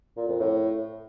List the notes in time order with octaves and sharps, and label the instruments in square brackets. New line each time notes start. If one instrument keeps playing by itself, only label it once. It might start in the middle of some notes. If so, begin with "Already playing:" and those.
[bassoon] A#2
F2
A2